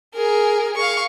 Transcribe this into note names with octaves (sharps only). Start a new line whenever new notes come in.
G#4 A#4
F5 C#6